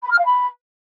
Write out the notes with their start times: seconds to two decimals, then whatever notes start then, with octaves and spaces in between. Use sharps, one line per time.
0.03 B5
0.11 F6
0.18 F5
0.25 B5